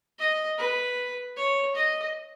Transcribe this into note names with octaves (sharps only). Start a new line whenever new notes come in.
D#5
B4
C#5
D#5